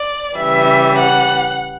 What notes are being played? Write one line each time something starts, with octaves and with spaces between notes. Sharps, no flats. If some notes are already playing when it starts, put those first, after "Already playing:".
Already playing: D5
C#3 E3 G3 E5
F#5